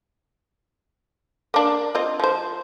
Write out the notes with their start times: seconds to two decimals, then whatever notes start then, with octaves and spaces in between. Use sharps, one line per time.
1.54 A#3 D4
1.95 C4 F4 D#5
2.20 F3 C5